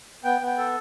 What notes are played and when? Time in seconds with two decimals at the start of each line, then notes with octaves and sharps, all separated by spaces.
0.24 B3 G5
0.41 B3
0.47 G5
0.58 A4